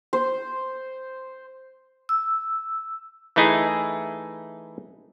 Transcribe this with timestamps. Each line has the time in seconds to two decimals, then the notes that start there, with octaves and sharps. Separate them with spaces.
0.13 C5
2.09 E6
3.36 E3 A3 D#4 E4 G#4